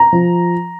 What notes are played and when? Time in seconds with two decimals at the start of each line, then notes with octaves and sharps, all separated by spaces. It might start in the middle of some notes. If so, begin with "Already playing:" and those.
Already playing: A#5
0.13 F3